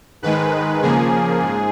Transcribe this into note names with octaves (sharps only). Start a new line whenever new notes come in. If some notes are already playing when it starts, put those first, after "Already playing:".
G#2 D#3 G#3 B4
C#3 F3 A#3 G#4
G#2